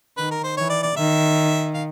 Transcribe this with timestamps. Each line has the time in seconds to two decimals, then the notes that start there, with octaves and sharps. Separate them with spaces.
0.17 D#3 B4
0.31 A#4
0.44 C5
0.57 E3 C#5
0.70 D5
0.83 D5
0.96 D#3 E5
1.74 F5